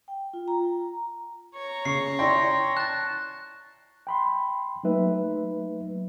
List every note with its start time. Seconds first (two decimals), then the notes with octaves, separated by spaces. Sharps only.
0.08 G5
0.33 F4
0.48 A#5
1.55 C#5 A#5
1.85 C#3 C#6 C7
2.19 E4 D5 G5 C6 A#6
2.77 A5 F#6 A6
4.07 G5 B5 C6
4.84 F#3 A3 A#3 D#4 B4 E5